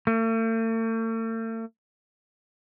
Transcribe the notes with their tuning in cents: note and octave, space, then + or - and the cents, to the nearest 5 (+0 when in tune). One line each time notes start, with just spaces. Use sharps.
A3 +45